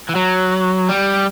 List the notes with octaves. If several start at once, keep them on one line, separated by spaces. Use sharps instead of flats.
E3
F#3
G3